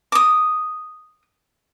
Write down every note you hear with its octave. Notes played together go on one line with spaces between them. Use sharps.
D6 D#6